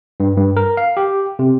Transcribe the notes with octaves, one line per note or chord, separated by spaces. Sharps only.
G2
G2
A#4
F5
G4
C3